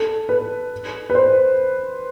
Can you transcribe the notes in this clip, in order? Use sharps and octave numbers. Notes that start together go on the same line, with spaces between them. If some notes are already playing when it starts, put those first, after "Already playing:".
Already playing: A4
B4
B4
C5